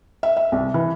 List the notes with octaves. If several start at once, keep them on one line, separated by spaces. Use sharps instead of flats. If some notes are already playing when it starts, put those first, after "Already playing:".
E5
E5
C2
E3